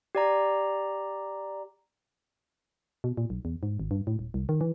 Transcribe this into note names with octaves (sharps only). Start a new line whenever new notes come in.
G4 D5 A#5
B2
A#2
B1
E2
G#2
G#1
G2
A2
D#1
C2
D#3
E3